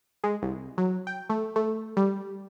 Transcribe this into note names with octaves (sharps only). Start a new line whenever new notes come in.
G#3
C2
F#3
G5
A3
A3
G3